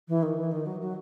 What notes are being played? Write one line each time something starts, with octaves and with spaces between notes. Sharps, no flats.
E3
D#3
E3
D#3
F#3
F#3